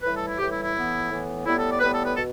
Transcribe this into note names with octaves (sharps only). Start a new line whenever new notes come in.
A2 E3 G3 B4
A4
E4
A2 E3 G3 G4
E4
E4
A2 E3 B3
A2 E3 B3
A2 G3 B3 E4
A4
D5
A2 G3 B3 B4
A4
B4
B2 A4